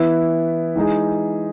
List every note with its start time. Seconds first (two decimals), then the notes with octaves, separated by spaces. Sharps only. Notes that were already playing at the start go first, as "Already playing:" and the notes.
Already playing: E3 B3 E4
0.76 E3 G#3 D#4 G#4